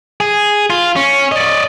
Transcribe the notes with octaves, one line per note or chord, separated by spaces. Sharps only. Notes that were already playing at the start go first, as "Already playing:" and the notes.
G#4
F4
C#4
D5 D#5